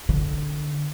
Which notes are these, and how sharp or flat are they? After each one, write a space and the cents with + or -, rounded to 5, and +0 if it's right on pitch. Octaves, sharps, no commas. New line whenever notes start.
D3 +10